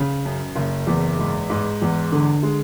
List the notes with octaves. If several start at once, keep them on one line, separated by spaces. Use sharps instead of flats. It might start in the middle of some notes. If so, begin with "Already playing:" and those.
Already playing: C#3
F#2
F#1
E2
G#2
G#2
E2
D3
G#3